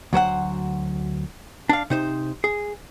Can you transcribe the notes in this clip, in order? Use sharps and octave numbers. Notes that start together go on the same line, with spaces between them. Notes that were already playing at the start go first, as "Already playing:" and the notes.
D2 F#3 C5 F#5
D4 F5
C3 D#4 C5
G#4